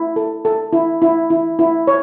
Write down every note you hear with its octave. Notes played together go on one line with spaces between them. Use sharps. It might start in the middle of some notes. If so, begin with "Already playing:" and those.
Already playing: E4
A4
A4
E4
E4
E4
E4
C#5